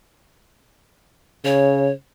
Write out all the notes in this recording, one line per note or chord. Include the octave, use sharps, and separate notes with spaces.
C#3 C#5